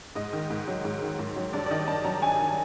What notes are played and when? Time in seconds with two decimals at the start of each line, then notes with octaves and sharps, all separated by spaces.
0.15 G#2 D#5
0.33 D#3
0.50 G#2
0.68 F#3
0.85 G#2
1.02 D#3
1.19 G#2
1.36 F#3
1.53 G2 D5
1.66 D5
1.70 D#3 D#5
1.88 G2 A5
2.05 F#3 A#5
2.22 G2 G#5
2.39 D#3